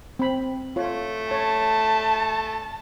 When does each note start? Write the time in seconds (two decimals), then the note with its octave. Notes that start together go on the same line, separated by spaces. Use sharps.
0.19 C4 B5
0.76 A3 F4 C#5
1.31 C#5 A5